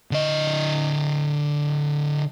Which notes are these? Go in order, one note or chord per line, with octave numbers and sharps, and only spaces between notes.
D3 D#5